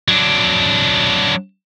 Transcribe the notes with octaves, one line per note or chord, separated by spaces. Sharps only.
F#3 D4